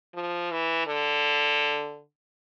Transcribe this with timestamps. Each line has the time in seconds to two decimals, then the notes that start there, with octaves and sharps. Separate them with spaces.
0.14 F3
0.51 E3
0.87 D3